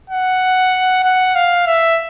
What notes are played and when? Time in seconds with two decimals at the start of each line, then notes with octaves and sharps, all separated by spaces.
0.10 F#5
1.04 F#5
1.35 F5
1.67 E5